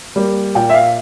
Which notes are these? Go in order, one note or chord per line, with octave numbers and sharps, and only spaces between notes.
G3 A#3
A#2 G5
E5
F5